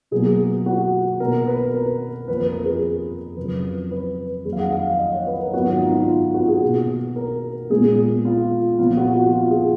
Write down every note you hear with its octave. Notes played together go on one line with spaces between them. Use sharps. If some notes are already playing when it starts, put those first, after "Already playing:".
B2 F#3 A#3 G#4
F#4
B2 A#3 A#4
B4
A#4
F2 F3 A#3 B4
B4
A#4
G#4
F2 C#3 F#3 B4
B4
F2 D#3 F#3 A#3 G#4
F5
F#5
F5
F5
D#5
C#5
B4
A#4
G#2 D#3 F#3 B3 F#4
F4
D#4
F4
F4
F#4
G#4
B2 A#3
A#4
A#2 G#3 B3 G#4
F4
A#2 F3 B3 F4
F#4
F#4
F4
G#4